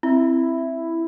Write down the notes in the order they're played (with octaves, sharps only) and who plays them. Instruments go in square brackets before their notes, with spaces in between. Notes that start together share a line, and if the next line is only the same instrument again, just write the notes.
[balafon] C4 [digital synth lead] E4